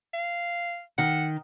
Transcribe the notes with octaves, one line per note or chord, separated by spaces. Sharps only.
F5
D#3 F#5